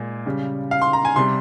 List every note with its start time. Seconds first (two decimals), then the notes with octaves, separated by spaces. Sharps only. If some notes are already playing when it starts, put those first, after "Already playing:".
Already playing: A#2 G#3
0.26 C#3 G3
0.71 F5
0.82 C6
0.93 A#5
1.05 G#5
1.16 C3 G3 C6